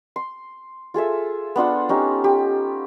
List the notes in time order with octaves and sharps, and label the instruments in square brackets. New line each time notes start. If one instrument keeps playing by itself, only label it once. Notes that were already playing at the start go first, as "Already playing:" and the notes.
[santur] C6
F4 G#4 A4 E5
B3 D4 F4 F#5
C#4 D#4 G4
G4